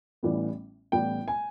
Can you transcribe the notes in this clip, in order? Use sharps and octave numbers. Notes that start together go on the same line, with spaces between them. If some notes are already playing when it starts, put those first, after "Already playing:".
A1 A2 E3 G3 B3
A1 A2 E3 G3 B3 G5
G#5